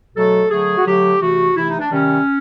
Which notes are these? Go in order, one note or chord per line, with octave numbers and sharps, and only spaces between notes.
B2 F#3 A3 A4
D3 F#3 A3 G#4
F#4
D3 F#3 A3 G4
C3 E3 A3 F#4
C3 E3 A3 E4
D#4
D4
C3 D#3 G3 C#4